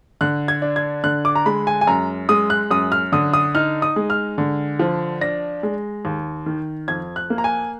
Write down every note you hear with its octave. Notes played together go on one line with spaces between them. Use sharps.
D3 F#6
G#6
D4
G#6
D3 F#6
D6
A#5
G#3 B5
G#5
G#5
F#2 A#5
G#3 D#6
F#6
F#2 D#6
F6
D3 D#6
D#6
D#4 F6
D#6
G#3
F6
D3
F3
D4 A#6
G#3
D#2
D#3
F2 G#6
F#6
A#3
A#5
G#5